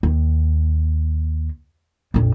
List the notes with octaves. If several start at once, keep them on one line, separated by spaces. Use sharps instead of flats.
D#2
A#1 F2